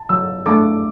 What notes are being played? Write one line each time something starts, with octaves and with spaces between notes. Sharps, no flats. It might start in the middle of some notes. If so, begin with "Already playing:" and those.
Already playing: A5
F#3 E6
A3 D4 A4 D6